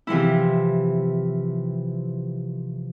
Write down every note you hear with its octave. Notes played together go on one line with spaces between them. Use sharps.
C3 E3 F3 E4